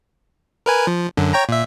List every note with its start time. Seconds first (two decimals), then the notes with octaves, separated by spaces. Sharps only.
0.66 A#4 B4 G#5
0.87 F3
1.17 F#2 D3
1.33 C#5 G5 A#5
1.49 A#2 E5